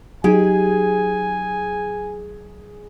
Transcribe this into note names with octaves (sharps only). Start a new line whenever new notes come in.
F#3 D#4 G4 G#4 G#5